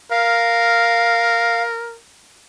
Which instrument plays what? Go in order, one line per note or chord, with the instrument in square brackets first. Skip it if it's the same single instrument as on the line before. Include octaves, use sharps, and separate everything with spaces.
[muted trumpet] A#4 [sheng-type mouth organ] F5